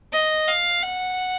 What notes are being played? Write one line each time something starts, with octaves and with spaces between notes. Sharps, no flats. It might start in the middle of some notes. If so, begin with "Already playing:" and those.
D#5
F5
F#5